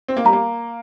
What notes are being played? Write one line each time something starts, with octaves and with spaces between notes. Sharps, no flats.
C4
A#3
G3 A#5
A#3